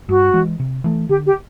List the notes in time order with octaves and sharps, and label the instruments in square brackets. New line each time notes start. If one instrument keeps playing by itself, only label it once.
[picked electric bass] G2 [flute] F#4
[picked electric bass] E3 G#3
C3
E3 A3
[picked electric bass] D3 [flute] G4
[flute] G4